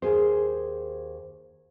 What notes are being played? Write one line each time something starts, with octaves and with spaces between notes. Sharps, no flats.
D#2 G#4 C5